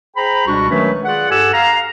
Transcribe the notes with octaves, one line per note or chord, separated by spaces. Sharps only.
G#4 C5 G5 A#5 B5
C#2 B2 G3 D4 F#4 C#6
D#3 F#3 G#3 A3 C#4 B4
F4 G#4 D5 F#5
G2 G4 A4 F#5 G#5 E6
F5 A#5